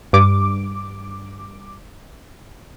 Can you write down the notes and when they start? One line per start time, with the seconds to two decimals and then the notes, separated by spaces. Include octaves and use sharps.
0.13 G2 D6